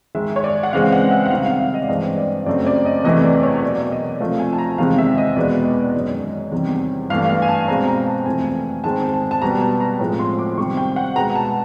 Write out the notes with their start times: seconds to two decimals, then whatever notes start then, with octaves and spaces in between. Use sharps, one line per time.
0.15 G#2 D#3 G#3 E5
0.36 C#5
0.44 D5
0.63 F#5
0.73 C#3 E3 G#3 C4 F5
0.92 F#5
1.11 E5
1.26 F#5
1.30 C3 D#3 G3 F5
1.45 F5
1.60 E5
1.74 D#5
1.82 D5
1.88 G2 E3 G#3 C4 D#5
2.18 D5
2.46 F#2 C#3 F#3 A3 C4 D5
2.67 D5
2.85 D#5
3.04 E2 C3 E3 A3 D#5
3.24 D5
3.43 C#5
3.63 B2 F#3 A#3 D5
3.91 D#5
4.20 C3 F3 A3 C4 F5
4.40 G#5
4.53 A5
4.58 A#5
4.78 E2 C3 D#3 G#3 F5
4.98 E5
5.18 D#5
5.36 E2 B2 G#3 B3 D5
5.65 D#5
5.94 F#2 D#3 G#3
6.52 E2 C3 D#3 G3
7.10 G2 E3 A3 F5
7.29 F5
7.42 G#5
7.48 A5
7.68 B2 G#3 C4 A#5
7.87 A#5
8.06 A5
8.26 F2 C3 E3 A3 C4 G#5
8.84 G#2 D#3 G#3 C4 A5
9.13 A5
9.31 A5
9.42 B2 G3 B3 A#5
9.61 A5
9.80 A#5
9.99 A2 F3 G#3 C4
10.19 C6
10.39 D6
10.58 C3 D#3 G3 C4 C#6
10.77 G5
10.96 F#5
11.15 B2 G#3 B3 A#5
11.35 A5